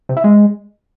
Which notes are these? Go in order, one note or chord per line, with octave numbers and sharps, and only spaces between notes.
C3
E4
G#3